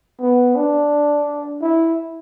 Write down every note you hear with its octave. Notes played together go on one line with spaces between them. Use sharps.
B3
D4
E4